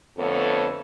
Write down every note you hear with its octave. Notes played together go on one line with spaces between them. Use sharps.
F2 D3 A3 B3 A4 C#5